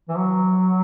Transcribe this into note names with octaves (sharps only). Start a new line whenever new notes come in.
E3
F#3